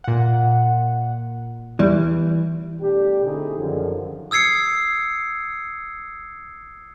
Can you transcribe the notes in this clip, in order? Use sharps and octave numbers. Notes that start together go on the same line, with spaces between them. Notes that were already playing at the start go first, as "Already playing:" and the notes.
A#2 F#5
E2 E3 G3
B2 G3 A3 D4 G4
D3 A3 C4 D#4 E4 G#4
F#2 D3 D#3 F3
D#6 E6 G#6 C7 C#7